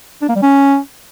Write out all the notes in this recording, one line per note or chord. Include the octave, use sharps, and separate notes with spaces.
D4
A#3
G3
C#4